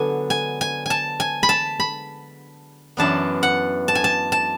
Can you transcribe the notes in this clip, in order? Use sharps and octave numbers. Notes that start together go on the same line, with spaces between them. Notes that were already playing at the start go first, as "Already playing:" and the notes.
Already playing: D3 F#3 B3 D4 G#5
G#5
G#5
G#5 A5
G#5
B5
A5
B5
F#2 E3 B3 D4 A5
F#5
A5
G#5
A5
A5